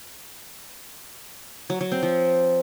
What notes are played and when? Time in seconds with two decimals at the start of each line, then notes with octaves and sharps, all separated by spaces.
1.70 F#3
1.81 F#3
1.92 C4
2.03 F3